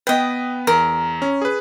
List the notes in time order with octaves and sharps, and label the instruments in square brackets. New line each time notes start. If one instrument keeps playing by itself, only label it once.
[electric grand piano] B3 B4 [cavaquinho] D#5 G5
[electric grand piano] E2 [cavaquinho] A#4
[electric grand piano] C#4
G#4 B4